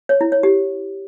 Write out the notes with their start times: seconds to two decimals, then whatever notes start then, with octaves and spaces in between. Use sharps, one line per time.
0.09 C#5
0.21 E4
0.32 C#5
0.43 G4